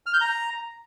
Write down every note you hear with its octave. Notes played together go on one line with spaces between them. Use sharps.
F6
G6
A#5